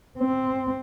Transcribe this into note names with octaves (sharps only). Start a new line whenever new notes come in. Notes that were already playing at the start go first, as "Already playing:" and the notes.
C4